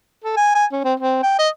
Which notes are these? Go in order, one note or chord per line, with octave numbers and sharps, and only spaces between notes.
A4
G#5
G#5
C#4
C4
C4
G5
D#5